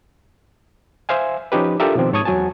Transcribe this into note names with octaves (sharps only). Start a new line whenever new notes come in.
C5 E5 F5 G#5
F3 C#4 D#4 G4 B4
D4 F4 G4 A4 A#4 E5
B2 D#3 F3 C4
G#2 C#5 A5 C#6 D#6 G#6
E2 F#3 F#4 G#5 A5